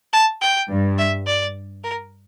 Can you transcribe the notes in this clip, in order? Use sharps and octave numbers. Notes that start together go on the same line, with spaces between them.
A5
G5
G2
E5
D5
A#4